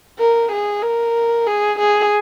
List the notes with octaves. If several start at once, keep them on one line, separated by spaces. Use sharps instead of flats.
A#4
G#4
A#4
G#4
G#4